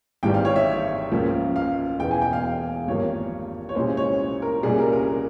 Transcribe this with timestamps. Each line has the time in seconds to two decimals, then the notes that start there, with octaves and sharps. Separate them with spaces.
0.23 G#1 G#2 E3 G3 G5
0.34 F5
0.45 C#5
0.56 E5
1.12 C#2 C#3 F3 A#3
1.56 F5
1.99 E1 E2 E3 G5
2.11 G#5
2.22 G5
2.33 F5
2.87 G#1 G2 F3 A#3 C#5
3.69 C#5
3.75 C2 A#2 G#3 C#4 C5
3.97 C#5
4.42 A#4
4.63 C2 A#2 G3 C#4 G#4
4.79 A#4
4.93 A#4